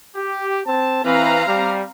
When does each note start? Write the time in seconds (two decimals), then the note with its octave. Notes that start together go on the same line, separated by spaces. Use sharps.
0.15 G4
0.66 C4 A5
1.05 E3 C4 E4 B4 F5 A#5
1.47 G3